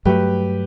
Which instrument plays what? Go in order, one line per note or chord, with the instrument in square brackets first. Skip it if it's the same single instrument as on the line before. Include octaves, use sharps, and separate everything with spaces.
[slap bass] G2 F#3 A3 [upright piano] G4 B4